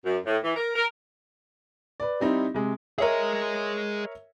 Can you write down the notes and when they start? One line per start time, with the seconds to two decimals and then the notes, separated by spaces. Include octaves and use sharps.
0.05 F#2
0.25 A2
0.43 E3
0.56 A#4
0.75 A#4
2.00 B4 D5
2.20 G3 C4 D#4 E4
2.54 C3 G#3
2.98 G#4 A#4 C#5 D#5 E5